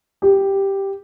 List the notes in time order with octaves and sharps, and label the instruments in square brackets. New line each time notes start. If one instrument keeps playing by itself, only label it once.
[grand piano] G4